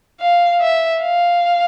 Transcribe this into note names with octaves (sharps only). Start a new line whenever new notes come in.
F5
E5
F5